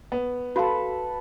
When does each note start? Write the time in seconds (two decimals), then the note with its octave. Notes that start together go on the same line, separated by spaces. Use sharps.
0.12 B3
0.56 F#4 A4 B4 F5